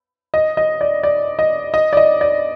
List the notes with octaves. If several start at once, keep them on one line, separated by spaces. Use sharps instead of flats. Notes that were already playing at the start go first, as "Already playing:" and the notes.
D#5
D#5
D5
D5
D#5
D#5
D5
D#5
D5